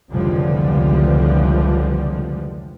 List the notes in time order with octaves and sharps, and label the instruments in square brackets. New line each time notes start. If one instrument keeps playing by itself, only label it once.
[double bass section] F1 C#2 D3 E3 F3 G3